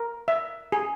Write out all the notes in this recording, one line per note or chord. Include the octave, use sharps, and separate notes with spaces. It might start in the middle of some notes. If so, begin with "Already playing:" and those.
Already playing: A#4
E5
G#4